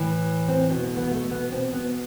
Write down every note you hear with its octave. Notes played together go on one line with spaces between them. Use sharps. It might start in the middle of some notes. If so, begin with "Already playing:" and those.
Already playing: A2 E3
C4
B2 B3
A3
B3
A3
B3
B2 C4
B3